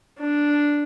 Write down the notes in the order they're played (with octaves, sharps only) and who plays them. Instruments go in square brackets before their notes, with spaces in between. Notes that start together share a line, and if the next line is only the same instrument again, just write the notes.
[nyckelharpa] D4